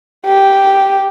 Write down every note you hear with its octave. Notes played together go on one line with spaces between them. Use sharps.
G4